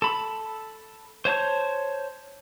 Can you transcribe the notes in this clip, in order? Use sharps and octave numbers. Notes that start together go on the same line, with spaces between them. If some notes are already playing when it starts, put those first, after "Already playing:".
A4 B5
C5 C#5 A5 G6